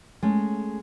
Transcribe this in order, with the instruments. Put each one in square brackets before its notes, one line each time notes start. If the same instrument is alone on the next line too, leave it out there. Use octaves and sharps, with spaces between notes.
[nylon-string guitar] G#3 A3 C#4